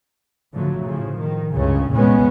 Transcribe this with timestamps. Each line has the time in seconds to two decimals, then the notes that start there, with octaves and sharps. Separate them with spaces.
0.53 G#2 D3 F3 F#3 A3
0.84 A2 C#3 F3
1.20 D#3
1.52 C#2 G2 C#3 C#4
1.91 F1 E2 A#2 G#3 B3 C#4